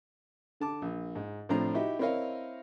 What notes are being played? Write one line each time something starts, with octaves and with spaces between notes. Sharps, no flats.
D3 A5 D6
A#1
G#2
A2 C3 F3 D4 C5 A#5
D#4 E4 F#4 G4 D#5 E5
C4 E4 A#4 C#5 D#5 F5